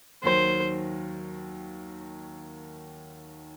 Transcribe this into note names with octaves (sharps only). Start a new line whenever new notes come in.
D#2 D#3 F#3 C5